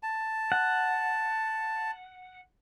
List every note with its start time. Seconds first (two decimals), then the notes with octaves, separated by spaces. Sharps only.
0.03 A5
0.52 F#5